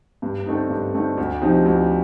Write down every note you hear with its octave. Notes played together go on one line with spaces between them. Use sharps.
G2
D3 A3 C4 D#4
G2
D3 A3 C4 D#4
D2
C3 F3 C4 D#4
D2